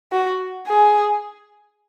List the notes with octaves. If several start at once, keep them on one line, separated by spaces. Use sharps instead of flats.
F#4
G#4